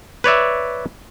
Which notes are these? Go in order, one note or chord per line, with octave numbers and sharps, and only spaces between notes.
B4 C#5 D5 E5